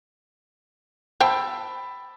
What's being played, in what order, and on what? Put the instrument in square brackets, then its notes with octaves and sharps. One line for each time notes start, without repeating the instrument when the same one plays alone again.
[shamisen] C5 F5 G5 [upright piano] A5 B5 E6